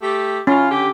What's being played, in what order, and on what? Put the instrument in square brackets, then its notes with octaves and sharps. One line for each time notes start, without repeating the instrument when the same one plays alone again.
[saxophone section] A3 G4
[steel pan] C#4 [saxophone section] E4 F4
[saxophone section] D3 G4